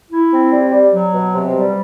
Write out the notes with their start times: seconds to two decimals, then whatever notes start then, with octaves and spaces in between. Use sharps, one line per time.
0.11 E4
0.32 C4
0.52 G3
0.72 G3
0.93 F#3
1.13 B2
1.33 C3
1.54 G3